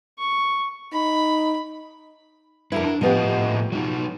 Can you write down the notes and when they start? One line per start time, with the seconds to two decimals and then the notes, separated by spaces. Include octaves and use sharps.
0.19 C#6
0.93 D#4 B5
2.72 F2 D4 E4 F#4 A#4 B4
2.84 D4
3.01 A2 F3 B3 G4 D#5 F#5
3.72 F#3 D#4